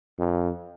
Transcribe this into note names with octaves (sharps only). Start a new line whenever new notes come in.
F2